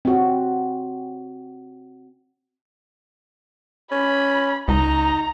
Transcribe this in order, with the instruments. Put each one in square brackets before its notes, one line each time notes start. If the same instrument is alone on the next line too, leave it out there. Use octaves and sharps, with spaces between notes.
[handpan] C4 F#4
[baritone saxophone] C#4 [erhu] B5
[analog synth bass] C#2 [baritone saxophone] D#4 [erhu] A#5